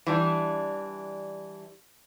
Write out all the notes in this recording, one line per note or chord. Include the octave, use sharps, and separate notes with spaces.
E3 G3 D4